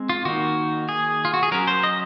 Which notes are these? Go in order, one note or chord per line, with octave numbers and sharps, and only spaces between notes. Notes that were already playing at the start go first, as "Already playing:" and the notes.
Already playing: G#3 C4
F4
D#3 A#3 D#4 F#4
G#4
F4
F#4
G#4
F#3 C#4 A#4
C5
D#5